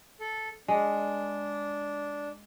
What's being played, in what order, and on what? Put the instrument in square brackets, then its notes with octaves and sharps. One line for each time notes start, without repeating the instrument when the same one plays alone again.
[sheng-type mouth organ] A4
[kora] G#3 [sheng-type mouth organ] D4